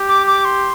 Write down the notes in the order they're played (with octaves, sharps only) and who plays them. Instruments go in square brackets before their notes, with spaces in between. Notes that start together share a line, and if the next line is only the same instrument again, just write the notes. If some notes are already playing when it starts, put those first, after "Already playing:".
Already playing: [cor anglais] G4
[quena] D6
D6
C6